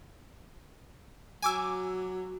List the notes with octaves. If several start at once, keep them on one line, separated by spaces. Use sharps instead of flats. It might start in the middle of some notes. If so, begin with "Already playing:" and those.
F#3 G#5 D6 E6